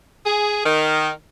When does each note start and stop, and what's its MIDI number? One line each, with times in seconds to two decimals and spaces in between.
0.25 0.63 68
0.64 1.09 51